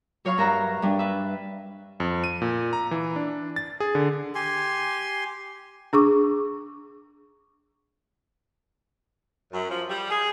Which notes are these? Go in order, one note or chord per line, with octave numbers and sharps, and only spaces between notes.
F#3 C#5 F5 B5 C#6
G2 A#4 E5 F#5 A#5
G2 G3 D4
B4 E5
F2
D#7
A#2
A#5
E3
D4
A6
G#4
D3
G4 G#5 C6
D4 G#4 C#6 D6
F#2
F3
G3
G#4